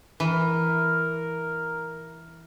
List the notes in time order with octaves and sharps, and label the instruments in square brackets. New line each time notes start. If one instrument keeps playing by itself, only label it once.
[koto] E3 [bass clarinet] A#4